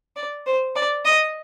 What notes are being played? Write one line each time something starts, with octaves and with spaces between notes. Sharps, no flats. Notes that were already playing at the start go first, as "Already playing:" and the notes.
D5
C5
D5
D#5